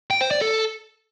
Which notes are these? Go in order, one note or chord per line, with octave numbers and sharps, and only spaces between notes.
G5
C5
D5
A4